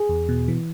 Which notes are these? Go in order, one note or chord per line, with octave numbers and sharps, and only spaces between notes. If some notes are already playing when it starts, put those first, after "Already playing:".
Already playing: G#4
E2
B2
E3